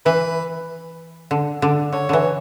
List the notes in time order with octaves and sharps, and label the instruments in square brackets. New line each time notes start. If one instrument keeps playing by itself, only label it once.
[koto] E3 [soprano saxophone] B4
[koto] D3
[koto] D3 [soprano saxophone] D5
[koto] D3 [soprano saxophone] C#5
[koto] D3 E3